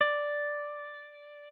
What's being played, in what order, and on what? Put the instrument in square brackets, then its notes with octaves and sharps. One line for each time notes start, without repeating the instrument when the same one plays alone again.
[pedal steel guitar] D5